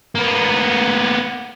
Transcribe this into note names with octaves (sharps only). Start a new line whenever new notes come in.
A#3 B3